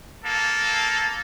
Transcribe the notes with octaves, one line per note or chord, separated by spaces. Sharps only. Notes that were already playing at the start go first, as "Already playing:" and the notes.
A#3 A4